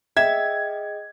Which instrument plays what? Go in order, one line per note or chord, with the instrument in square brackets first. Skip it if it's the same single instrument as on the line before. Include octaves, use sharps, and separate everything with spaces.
[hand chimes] G#4 D#5 G5 [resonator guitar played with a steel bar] E5 [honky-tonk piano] G#6